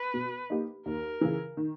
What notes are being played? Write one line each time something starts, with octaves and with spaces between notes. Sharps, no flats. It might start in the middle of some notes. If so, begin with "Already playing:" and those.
Already playing: B4
B2
A#3 D#4 G4
D#2 A#4
C#3 E3
D#3